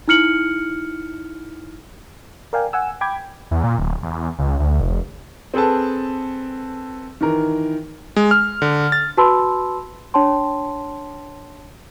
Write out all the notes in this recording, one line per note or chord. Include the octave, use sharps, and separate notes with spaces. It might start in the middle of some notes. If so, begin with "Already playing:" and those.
D#4 E4 F6 C#7 F#7
A#4 D5 F5 G5 G#5
F#5 G#5 E6
G5 B5 D6 G#6
E2
A#2
D1
E2
C#2
D2
F1
C4 G#4 A4 B4 A5
D#3 E3 A#4
G#3
F6
D3
A6
F#4 B4 A5 B5 C6 E6
D4 C#5 G5 A5 C6